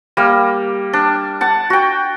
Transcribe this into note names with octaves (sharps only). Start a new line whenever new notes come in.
G3 A#3
D4
F#5 A5
F#4 G5